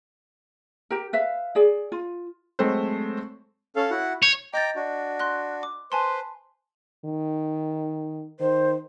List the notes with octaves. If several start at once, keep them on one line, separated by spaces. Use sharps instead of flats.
G4 A#4
B4 E5 F5
G#4 D5
F4
F#3 G#3 A3 C4 A4 C5
C#4 A4 F5
E4 F#4 F#5
C#5 G6
D#5 G5 A#5 D6 G6 A6
D4 F#4
C6 F#6 A#6
D6
B4 C5 G#5 A5 C6
D#3
D#3 C5